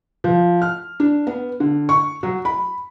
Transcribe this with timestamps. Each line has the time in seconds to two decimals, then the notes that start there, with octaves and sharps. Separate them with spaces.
0.24 F3
0.62 F6
1.00 D4
1.27 B3
1.60 D3
1.89 C#6
2.23 F#3
2.45 B5